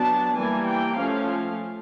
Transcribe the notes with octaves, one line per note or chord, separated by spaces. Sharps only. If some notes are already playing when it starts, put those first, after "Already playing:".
Already playing: F#3 B3 D4 A5
E3 G3 A#3 G#5
G5
F3 A3 C#4 F5